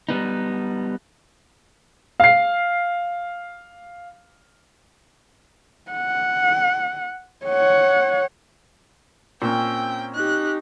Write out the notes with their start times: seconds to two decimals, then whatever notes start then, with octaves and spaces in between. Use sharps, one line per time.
0.09 G3 B3 D#4
2.20 F5 C7
5.91 F#5
7.46 C#5 F#5
9.42 A#2 C4 C#4 G5
10.15 D#4 G4 F#6